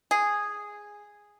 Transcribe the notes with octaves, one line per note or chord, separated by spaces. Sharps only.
G#4